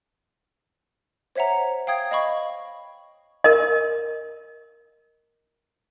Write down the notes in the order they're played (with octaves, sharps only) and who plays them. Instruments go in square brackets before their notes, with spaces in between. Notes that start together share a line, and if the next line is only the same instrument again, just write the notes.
[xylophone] C5 C#5 E5 F#5 A#5
F5 G5 D#6 G#6
D#5 F5 B5 C#6
[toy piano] A#4 D#5